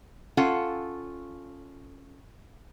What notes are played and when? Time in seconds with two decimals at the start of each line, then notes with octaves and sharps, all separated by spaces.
0.37 C#4 F4 A4 F#5